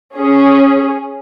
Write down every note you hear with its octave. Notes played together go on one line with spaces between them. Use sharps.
C#4 G#4